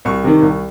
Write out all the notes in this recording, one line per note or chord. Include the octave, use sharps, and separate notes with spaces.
C2 C#6
C3 D#3
C2